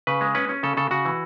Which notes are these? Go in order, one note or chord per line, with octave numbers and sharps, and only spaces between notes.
C#3 B4
G#3
C#4 B4
C#4
C#3 A4
C#3 A4
C#3 F#4
E3